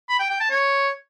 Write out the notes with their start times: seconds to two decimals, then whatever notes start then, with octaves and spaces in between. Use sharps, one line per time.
0.09 B5
0.19 G5
0.30 G5
0.40 A5
0.50 C#5